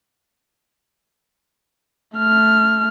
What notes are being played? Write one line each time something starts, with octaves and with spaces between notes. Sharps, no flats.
A3 F6